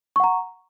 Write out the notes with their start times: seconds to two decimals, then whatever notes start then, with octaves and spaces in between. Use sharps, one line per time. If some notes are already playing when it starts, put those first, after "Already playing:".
0.16 C#6
0.20 F#5
0.24 A#5